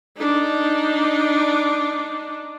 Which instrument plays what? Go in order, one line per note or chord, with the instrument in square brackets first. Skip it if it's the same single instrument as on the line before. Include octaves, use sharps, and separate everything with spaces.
[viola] D4 D#4